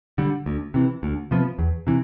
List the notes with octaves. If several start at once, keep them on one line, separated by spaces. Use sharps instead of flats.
D3 G3
D2
C3 E3
D2
C3 F3 B3
E2
C3 E3